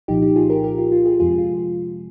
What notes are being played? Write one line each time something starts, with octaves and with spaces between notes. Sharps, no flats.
C2 A#2 F3 D#4 G4
D#4 G4
F4 G#4
G4 A#4
G4 A#4
F4
F4
F4 G#4
F2 C3 F3 G#3 F4 G#4
F4